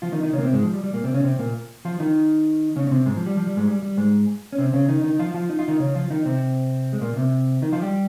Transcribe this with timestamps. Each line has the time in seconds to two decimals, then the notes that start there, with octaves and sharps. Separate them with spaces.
0.02 F3 F4
0.12 D#3 D#4
0.23 D#3 D#4
0.33 C#3 C#4
0.38 A#3
0.43 C3 C4
0.53 G#2 G#3
0.63 F3
0.73 G3
0.84 G3
0.93 A#2 A#3
1.04 C3 C4
1.14 C#3 C#4
1.24 C3 C4
1.39 A#2 A#3
1.85 F3 F4
2.00 D#3 D#4
2.76 C#3 C#4
2.87 C#4
2.91 C3 C4
3.06 G#2 G#3
3.16 F3
3.26 G3
3.37 F3
3.47 G3
3.57 G#2 G#3
3.67 G3
3.82 G3
3.97 G#2 G#3
4.53 C#4
4.58 C3 C4
4.73 C#3 C#4
4.88 D#3 D#4
5.04 D#3 D#4
5.19 F3 F4
5.34 F3 F4
5.50 D#4
5.59 F4
5.68 D#3 D#4
5.80 C#3 C#4
5.95 F3 F4
6.10 D#3 D#4
6.25 C3 C4
6.93 G#3
7.01 A#2 A#3
7.16 C3 C4
7.62 D#3 D#4
7.72 F3 F4
7.82 G3 G4